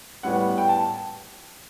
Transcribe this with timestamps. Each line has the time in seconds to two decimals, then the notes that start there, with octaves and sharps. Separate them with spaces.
0.23 A2 G3 B3 F#5
0.58 G5
0.69 A5